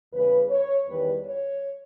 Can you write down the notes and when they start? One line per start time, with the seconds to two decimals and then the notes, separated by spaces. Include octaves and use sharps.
0.13 E2 C#3 G3 B4
0.50 C#5
0.87 E2 D#3 G3 B4
1.23 C#5